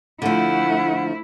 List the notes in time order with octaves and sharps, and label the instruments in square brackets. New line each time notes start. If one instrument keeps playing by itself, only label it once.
[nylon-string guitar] D3 F3 [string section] A3 [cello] E4 [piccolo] F#5